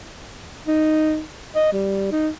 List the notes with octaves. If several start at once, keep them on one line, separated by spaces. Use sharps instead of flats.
D#4
D#5
G3
D#4